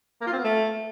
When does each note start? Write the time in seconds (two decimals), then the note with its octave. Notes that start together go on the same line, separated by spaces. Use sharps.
0.21 A#3
0.27 F4
0.33 C4
0.38 B3
0.44 A3